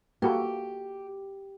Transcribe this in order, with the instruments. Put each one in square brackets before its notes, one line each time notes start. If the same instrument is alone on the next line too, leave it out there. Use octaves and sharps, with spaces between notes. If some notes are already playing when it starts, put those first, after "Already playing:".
[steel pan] A#3 F#4 A4 [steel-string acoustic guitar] G4